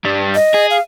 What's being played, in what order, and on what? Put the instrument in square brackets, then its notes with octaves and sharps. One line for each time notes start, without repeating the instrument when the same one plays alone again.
[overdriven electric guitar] G2 G3
[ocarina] D#5
[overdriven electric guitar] G#4
[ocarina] F5